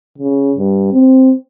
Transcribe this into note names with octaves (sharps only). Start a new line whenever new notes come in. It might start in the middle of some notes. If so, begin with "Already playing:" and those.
C#3
G2
C4